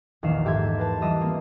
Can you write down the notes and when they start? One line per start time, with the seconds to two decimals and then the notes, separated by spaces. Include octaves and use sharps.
0.23 A#1 E2 D#3 F5 C7 E7
0.45 G#2 G4 A4 E5 C6 G#6
0.78 A#4 B4 A5
1.01 E3 G3 F4 D#5 E6 E7
1.21 A#3 C4